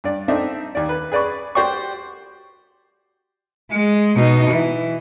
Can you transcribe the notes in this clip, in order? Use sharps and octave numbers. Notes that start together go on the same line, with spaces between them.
G2 D5
C4 D4 D#4 A4 E5
D#2 D5
B4
G#4 B4 D5 B5 C#6
F#4 G4 C5 D5 G5 C#6
G#3
B2 D#4
E3